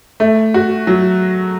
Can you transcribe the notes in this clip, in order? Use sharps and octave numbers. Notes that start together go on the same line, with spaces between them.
A3
F#4
F#3